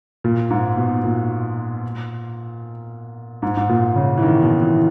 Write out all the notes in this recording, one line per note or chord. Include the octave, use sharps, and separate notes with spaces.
A#2
G#2
B2
A#2
G#2
G#2
A#2
C#3
E3
D#3
B2
E3